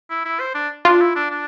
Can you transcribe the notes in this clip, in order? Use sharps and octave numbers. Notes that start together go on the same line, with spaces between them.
E4
E4
C5
D4
D4 F4
E4
D4
D4